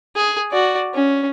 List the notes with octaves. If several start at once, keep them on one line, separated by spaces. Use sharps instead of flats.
G#4
F#4 D5
C#4